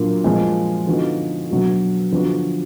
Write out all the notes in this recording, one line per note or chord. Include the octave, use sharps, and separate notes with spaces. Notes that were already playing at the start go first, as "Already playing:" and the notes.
Already playing: A#2 F#3 A#3 D4 F4
A#2 F3 G#3
D3 F3 B3 D#4 F#4
B2 F#3 D4 F#4
D3 F3 B3 D4 F#4